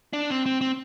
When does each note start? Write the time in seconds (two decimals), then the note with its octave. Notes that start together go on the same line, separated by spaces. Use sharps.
0.13 D4
0.30 C4
0.46 C4
0.61 C4